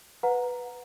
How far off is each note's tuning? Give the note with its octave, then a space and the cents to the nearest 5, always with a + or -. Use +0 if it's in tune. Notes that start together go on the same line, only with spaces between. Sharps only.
B4 +0 F#5 -25 A#5 +0